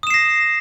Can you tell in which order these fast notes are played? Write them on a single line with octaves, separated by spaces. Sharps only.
D#6 E7 C7 A#6